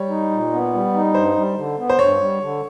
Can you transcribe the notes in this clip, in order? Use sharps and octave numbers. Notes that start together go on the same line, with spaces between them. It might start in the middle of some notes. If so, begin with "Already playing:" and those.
Already playing: G3 C#5
D#4
A#2
B3
G3
D#4
G2 C5
G3
D3
B3
C5
G2 C#5
G3
D3